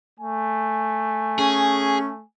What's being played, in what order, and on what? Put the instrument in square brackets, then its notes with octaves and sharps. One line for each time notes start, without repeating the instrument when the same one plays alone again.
[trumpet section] A3 G#5
[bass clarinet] C#4 [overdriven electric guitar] G#4